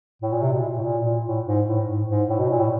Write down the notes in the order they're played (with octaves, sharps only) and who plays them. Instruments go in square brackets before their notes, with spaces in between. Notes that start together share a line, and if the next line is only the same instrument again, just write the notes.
[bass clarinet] A2
A#2
C3
B2
A2
A#2
A#2
A2
G#2
A2
G#2
G#2
A2
B2
A#2
A2